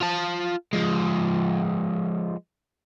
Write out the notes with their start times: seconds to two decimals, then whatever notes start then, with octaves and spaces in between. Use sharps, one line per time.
0.01 F4 A5
0.73 F3 G#3